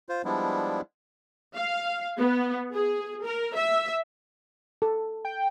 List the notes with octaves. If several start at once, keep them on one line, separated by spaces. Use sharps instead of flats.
F4 C5
F3 G3 G#3 B3 D4 E4
F5
B3
G#4
A#4
E5
A4
G5